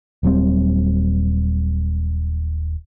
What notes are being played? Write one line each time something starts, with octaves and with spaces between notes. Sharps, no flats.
D#1 F#3 G3 C4